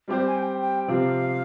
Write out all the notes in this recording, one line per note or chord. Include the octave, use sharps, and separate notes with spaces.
G3 C4 G4 C5
G#5
G5
G5
C3 F3 C4 G4 F5